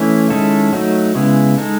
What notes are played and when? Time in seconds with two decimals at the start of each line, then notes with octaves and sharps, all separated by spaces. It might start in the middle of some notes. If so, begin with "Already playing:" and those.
Already playing: E3 A3 C#4 E4
0.30 D#3 G#3 C#4 E4 A4
0.73 F#3 A3 D#4
1.15 C#3 G#3 B3 E4
1.57 G#3 D#4 A4